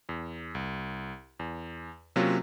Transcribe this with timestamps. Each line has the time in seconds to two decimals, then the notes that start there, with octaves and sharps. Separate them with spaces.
0.09 E2
0.55 C2
1.39 E2
2.16 C3 F#3 A#3 C#4 F4